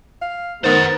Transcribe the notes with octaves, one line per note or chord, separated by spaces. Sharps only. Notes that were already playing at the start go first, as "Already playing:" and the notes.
F5
D#3 B3 A#4 C5 F#5 A6